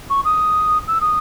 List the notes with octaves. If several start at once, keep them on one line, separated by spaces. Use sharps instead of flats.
C#6
D#6
E6
D#6